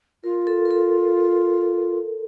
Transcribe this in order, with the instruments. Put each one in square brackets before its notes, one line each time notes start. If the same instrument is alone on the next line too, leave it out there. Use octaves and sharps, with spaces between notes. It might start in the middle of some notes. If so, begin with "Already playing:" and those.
[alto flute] F4 [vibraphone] A#4
[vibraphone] A4
A#4
A4